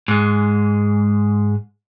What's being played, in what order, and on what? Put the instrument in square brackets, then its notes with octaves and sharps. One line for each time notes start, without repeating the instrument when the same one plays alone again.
[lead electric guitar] G#2 G#3